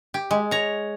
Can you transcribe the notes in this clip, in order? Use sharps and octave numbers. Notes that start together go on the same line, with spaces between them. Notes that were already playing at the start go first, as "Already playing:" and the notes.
G4
G#3
C#5 A#5